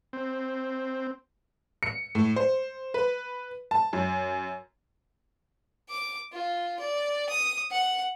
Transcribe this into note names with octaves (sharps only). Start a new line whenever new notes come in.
C4
C#7
A2
C5
B4
A5
F#2
D6
F4
D5
D#6
F#5